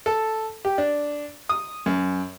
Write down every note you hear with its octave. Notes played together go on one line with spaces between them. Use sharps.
A4
G4
D4
D#6
F#2